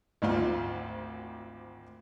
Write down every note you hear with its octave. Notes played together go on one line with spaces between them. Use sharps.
G#1 D2 F4